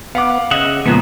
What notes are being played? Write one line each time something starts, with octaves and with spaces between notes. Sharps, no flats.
B3 F5 F#5 D6
C#3 D#5 E5 F#5 D#6
C#2 A#2 F3 B3